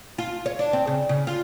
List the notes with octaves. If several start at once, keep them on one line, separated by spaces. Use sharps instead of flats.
F4
C#5
D4
C4
C#3
C#3
F4